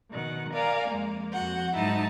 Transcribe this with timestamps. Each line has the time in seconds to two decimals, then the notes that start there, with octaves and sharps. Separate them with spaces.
0.10 B2 D#3 F#5
0.54 A#4 D5 F5 G#5 A#5
0.89 F2 G#3 A#3
1.33 F2 F#4 F#5 G6
1.75 G#2 F#3 D#4 E4 A5